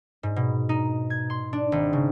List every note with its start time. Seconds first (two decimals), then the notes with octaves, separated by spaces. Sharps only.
0.23 G#2
0.36 B2
0.69 D#4
1.10 G#6
1.30 C6
1.53 D4
1.72 G#1
1.93 C#3